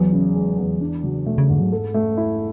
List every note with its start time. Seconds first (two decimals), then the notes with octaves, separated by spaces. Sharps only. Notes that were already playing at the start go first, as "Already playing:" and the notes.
Already playing: E2 F#3
0.12 C#3
0.35 G#3
0.58 E2
0.81 E3 D4
1.03 C#3 F#3
1.26 B2 A3
1.38 C#3
1.49 G#2 D3
1.61 F#3
1.72 A4
1.94 A3
2.17 E4